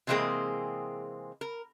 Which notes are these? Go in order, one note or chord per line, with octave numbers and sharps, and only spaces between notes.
C3 E3 G#3 A#3 C4 G#4
A#4